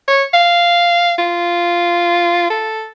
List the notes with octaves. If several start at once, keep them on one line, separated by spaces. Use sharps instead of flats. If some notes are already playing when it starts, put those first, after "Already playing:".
C#5
F5
F4
A4